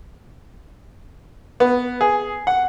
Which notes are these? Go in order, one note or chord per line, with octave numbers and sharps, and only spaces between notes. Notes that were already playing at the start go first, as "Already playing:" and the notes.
B3
G#4
F#5